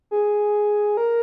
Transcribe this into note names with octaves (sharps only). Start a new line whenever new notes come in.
G#4
A#4